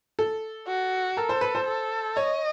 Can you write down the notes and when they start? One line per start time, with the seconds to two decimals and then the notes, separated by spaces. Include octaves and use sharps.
0.19 A4
0.67 F#4
1.17 A4 A#4
1.29 C5
1.41 B4
1.55 C5
1.67 A4
2.16 C#5 D#5